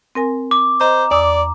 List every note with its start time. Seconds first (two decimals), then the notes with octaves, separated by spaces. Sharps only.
0.15 C4 A#4 G#5
0.51 D6
0.81 C5 D#5 A#5
1.11 E2 D5 D#6 E6